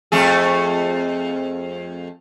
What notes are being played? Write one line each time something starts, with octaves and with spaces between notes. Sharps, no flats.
F2 A3 G#4